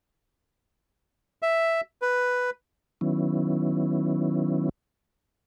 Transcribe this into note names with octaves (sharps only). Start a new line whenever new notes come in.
E5
B4
D#3 F#3 B3 C#4 E4